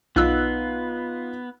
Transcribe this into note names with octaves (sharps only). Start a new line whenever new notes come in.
B1 B3 D#4 F4 E6 F#6